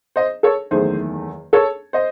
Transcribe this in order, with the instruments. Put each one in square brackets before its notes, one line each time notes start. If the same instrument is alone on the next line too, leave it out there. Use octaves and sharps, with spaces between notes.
[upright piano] C5 D#5
A4 C#5
F#1 E2 D#3 A3 G#4 C5
A4 C#5
C5 D#5